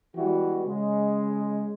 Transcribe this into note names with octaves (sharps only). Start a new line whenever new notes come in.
E3 G3 G#3 B3 F#4
C#3 G#3